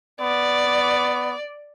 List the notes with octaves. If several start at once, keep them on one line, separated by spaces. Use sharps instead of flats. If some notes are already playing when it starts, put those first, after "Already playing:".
B3 D5